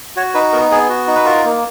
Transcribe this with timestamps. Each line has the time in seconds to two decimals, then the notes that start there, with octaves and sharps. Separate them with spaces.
0.16 F#4 C#5
0.34 D#4 B4
0.52 B3 A#4
0.71 B3 G#4
0.89 F#4
1.07 D#4
1.15 B4
1.25 F4 A#4
1.44 A#3